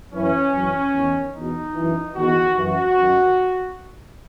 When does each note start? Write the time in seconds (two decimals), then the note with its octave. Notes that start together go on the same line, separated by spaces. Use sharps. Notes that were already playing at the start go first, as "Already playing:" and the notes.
0.11 F#2 E3 C#4
0.53 F#2 E3
0.93 E2 D#3
1.33 E2 B2 D#4
1.74 F#2 E3
2.15 E2 D#3 F#4
2.56 F#2 E3 F#4
2.97 F#2 D#3